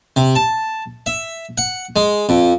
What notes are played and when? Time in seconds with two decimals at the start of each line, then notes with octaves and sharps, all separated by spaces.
0.16 C3
0.36 A5
1.06 E5
1.58 F#5
1.96 G#3
2.29 F2